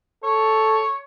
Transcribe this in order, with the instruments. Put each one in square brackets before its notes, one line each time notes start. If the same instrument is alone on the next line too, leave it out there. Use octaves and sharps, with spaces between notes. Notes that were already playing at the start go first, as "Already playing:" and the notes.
[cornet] A4 [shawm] C#5